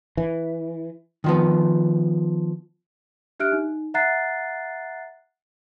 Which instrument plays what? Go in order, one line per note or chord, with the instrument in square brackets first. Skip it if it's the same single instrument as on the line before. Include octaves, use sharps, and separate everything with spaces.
[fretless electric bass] E3
[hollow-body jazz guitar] D#3 F3 B3
[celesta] D4 G4 E5 F6 F#6 D7
D#4
E5 F#5 A#5 F#6 A6 C7